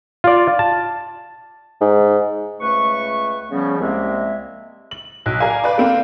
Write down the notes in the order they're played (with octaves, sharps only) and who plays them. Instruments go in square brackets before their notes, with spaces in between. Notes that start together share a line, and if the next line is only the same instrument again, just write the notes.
[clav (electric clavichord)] F4 D5
A5
[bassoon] G#2
[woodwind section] C#2 A3 B4 C#6
C#3 F3 G3 B3 C#4
C2 G#3 A#3 C4 E5
[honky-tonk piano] F#7
[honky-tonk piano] B1 [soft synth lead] F#6
[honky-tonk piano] A#4 D5 G#5 [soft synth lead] F5
[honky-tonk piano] B4 D5
A#3 C4 A4